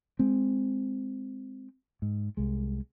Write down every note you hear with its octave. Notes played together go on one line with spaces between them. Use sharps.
G#3 C4
G#2
C2 G#3